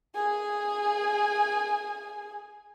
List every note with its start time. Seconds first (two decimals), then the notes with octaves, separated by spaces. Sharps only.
0.14 G#4 G#5